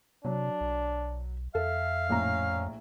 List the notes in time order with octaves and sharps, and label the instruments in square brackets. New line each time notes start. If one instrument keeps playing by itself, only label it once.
[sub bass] C3 [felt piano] F#3 [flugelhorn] D4
[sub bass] B1
[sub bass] F2 [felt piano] A4 [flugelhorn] E5 [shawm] F5
[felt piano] A#1 A2 A#5 [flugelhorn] C#4